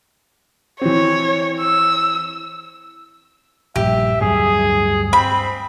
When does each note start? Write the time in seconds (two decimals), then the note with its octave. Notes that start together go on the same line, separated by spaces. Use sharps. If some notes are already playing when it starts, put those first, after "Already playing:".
0.81 E3 C4 C#5
1.60 E6
3.76 A#1 G2 G4 E5
4.21 D2 G2 F#3 G#4
5.13 C4 B5